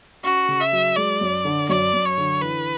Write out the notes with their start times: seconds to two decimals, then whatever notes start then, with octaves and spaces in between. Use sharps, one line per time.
0.24 C#4 F#4
0.48 C#3
0.60 E5
0.72 F#3
0.96 G#3 D5
1.21 F#2
1.45 D3
1.69 F#2 D5
1.94 F#2
2.05 C#5
2.18 D3
2.42 E3 B4